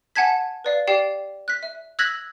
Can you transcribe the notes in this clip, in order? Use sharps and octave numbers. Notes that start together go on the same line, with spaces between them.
F#5 G#5 A5 G#6 B6
B4 D5 F5
G4 D5 G5 C7
F#6 B6
E5
E6 F#6 G#6 A#6 B6 F#7